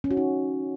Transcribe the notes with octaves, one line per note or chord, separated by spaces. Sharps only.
C#4
F#4
D#4